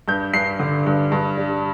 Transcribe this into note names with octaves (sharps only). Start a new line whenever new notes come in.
G2 G6
G2 C7
D3
G2
G2
G3